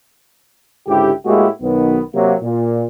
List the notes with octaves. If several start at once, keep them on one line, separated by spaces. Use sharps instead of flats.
C#2 G#2 D3 E4 G4
A2 G#3 A#3 E4 F#4 G4
B1 D#3 B3
C3 F#3 A#3
A#2